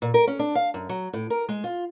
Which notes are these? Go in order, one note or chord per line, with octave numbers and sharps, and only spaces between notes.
A#2
A#4
C#4
D4
F5
F#2
F#3
A2
A#4
G#3
F4